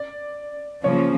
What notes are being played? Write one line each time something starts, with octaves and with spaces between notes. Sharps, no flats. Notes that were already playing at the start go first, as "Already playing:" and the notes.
Already playing: D5
C#3 F3 A#3 C#4 C#5